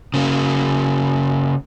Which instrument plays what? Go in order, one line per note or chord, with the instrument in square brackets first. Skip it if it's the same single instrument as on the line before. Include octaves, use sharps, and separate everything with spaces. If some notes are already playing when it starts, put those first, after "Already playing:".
[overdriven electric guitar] C#3 A#3